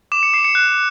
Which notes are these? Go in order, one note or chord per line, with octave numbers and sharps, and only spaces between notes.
D6 E7
C#7
D6 C7
C#7
F#6